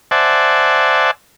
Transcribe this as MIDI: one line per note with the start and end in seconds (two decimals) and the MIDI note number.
0.11 1.11 72
0.11 1.11 74
0.11 1.11 76
0.11 1.11 78
0.11 1.11 80
0.11 1.11 81